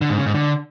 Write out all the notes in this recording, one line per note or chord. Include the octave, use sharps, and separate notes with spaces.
D3
G#2
C#3
G#2
D3